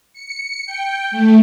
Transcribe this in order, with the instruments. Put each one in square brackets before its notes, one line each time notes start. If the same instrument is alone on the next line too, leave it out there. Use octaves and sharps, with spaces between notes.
[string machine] C#7
G5
A3